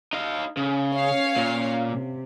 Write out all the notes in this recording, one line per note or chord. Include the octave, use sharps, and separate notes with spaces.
D#4 F5
C#3
C#4 C#5 F5
A#2
C3